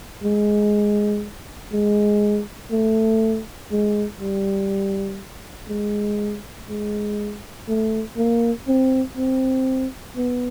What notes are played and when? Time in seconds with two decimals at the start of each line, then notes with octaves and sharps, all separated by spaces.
0.24 G#3
1.72 G#3
2.71 A3
3.71 G#3
4.20 G3
5.69 G#3
6.69 G#3
7.68 A3
8.17 A#3
8.68 C4
9.17 C4
10.16 B3